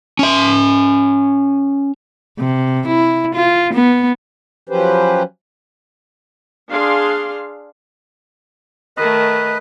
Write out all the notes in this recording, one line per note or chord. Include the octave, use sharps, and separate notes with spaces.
C#4 E5
C3
E4
F4
B3
F3 F#3 C#4 G4 B4 C5
D4 G#4 F5 C6
D#3 A3 B4 D#5